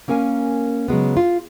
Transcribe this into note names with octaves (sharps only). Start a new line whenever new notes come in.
A#3 C#4 A#4 F5 G#5
C#3 F#3 G#3 B3
F4